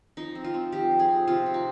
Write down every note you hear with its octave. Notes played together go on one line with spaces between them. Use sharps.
F3 D#4
C4
F4
C4
F3 G4
F3
G#4
C4
C3 F4
C3
D#4